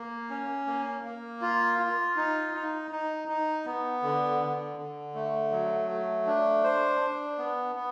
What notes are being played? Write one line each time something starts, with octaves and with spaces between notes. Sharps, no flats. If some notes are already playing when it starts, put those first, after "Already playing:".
Already playing: A#3
C#4
A#3
A#3
F4
F4
D#4
D#4
D#4
D#4
B3
D3
D3
D3
A3
F#3
A3
D4
C5
D4
B3
B3